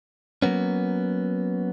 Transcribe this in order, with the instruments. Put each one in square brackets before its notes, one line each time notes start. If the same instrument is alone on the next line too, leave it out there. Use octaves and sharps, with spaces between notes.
[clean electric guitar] F#3 A#3 B3 C#4